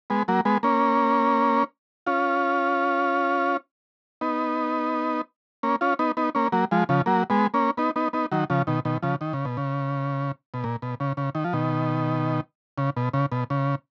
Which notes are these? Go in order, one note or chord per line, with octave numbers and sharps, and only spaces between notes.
G#3 B3
F#3 A#3
G#3 B3
A#3 C#4
C#4 F4
B3 D#4
A#3 C#4
C#4 F4
B3 D#4
B3 D#4
A#3 C#4
F#3 A#3
F3 G#3
C#3 F3
F#3 A#3
G#3 B3
A#3 C#4
B3 D#4
B3 D#4
B3 D#4
D#3 F#3
C#3 F3
B2 D#3
B2 D#3
C#3 F3
D#3
C#3
B2
C#3
B2
A#2
B2
C#3
C#3
D#3
F3
B2 D#3
C#3
B2
C#3
B2
C#3